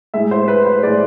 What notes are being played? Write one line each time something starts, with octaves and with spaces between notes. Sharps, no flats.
A2 G#3 E5
C5
B4
C5
A2 G#3 D5